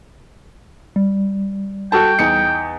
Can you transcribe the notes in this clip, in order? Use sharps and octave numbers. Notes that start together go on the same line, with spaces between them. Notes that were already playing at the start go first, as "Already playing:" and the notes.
G3
F#4 A4 G5 A5
E2 D#4 C#7